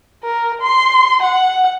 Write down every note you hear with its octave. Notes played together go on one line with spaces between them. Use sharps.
A#4
C6
F#5